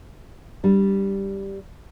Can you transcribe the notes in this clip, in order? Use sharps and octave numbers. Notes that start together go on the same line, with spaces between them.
G3 D4